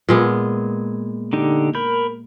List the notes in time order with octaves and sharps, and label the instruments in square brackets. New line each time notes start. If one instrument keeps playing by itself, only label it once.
[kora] A#2 G#3 B3
[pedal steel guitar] D3 D#4 G4
A#4 B5 G6